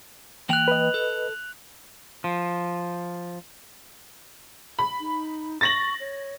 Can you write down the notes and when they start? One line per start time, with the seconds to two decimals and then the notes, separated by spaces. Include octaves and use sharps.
0.49 E3 A#3 G5 F#6 F7 F#7
0.68 B4 D#5
0.94 A4
2.24 F3
4.79 B5
5.00 D#4
5.61 C#6 A6 A#6 F#7
6.00 C#5